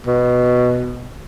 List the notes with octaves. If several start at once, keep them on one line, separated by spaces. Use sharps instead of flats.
B2